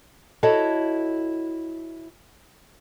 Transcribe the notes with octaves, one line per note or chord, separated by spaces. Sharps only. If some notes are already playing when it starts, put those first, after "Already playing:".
E4 F#4 A4 C#5 D#5